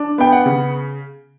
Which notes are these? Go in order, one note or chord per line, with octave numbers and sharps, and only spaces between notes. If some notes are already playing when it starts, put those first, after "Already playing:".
Already playing: D4
B3 G5
F#5
C#3